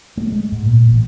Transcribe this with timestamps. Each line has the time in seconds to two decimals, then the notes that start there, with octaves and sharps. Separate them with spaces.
0.17 A3
0.32 G#3
0.52 G#2
0.66 A#2
0.91 A1